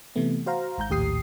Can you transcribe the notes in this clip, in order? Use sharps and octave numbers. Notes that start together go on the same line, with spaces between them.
C3 E3 A3 B3
F#4 C5 F5 A#5
G#1 G#2 A#5 G6
A#1 D#2 A2 G4 D#6 C7